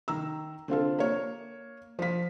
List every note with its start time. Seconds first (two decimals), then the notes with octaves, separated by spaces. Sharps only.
0.08 D#3 A#5 E6
0.68 D3 C4 F4 A4
0.99 A#3 C#5
1.99 F3 B6